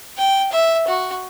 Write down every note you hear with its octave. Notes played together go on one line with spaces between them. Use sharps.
G5
E5
F#4